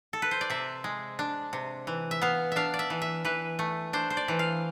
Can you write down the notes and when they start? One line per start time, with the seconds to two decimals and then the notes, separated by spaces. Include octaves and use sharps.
0.13 A4
0.22 B4
0.31 C5
0.41 D5
0.50 C3 E5
0.84 G#3
1.19 D4
1.53 C3
1.87 E3
2.11 E5
2.22 B3 F5
2.52 D4 E5 F5
2.74 D5
2.79 E5
2.90 E3
3.02 E5
3.25 E3 B4
3.59 A3
3.93 D4 C5
4.10 C5
4.17 D5
4.28 E3
4.39 F5